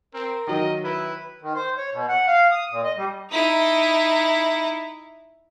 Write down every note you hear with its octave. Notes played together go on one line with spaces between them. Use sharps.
C4 A#4
D#3 F#3 D#5
E4 B4
D#3
C5
C#5
B2
F#5
F5
D#6
A#2
D#5
G3
D#4 E4